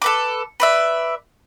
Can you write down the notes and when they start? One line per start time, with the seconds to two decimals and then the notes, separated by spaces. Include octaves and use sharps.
0.02 A4 B4 D6
0.60 B4 D5 E5